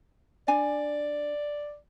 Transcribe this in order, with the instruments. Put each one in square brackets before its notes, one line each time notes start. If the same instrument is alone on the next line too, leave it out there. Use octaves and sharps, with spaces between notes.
[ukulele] D4 G#5 [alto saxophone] D5